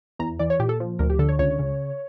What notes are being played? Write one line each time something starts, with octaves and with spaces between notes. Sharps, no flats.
E2 A#5
E3 D5
C#5
A#2 G4
A4
F3
D2 A#4
G4
D3 A4
C#5
C#2 C#5
C#3